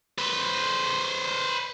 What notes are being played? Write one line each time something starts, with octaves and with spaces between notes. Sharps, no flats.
B4 C5